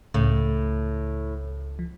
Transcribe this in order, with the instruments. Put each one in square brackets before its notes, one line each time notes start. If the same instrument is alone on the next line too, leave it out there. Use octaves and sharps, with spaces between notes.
[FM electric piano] C#2 C#3 [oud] A2
[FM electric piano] F3